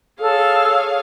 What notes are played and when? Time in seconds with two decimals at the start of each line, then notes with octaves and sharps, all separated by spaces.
0.20 G#4 A4 C#5 F5